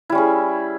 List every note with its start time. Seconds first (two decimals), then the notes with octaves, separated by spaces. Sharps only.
0.09 E4
0.12 G3
0.15 C#4
0.18 G#4